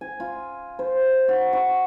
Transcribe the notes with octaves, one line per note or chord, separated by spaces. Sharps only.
G#5
F4
C5
F#4
C#6